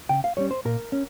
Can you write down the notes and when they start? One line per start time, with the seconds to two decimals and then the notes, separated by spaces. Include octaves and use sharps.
0.09 C#3 G5
0.24 F5
0.37 G3 C#4 C#5
0.51 C5
0.65 A#2 A#4
0.92 C#4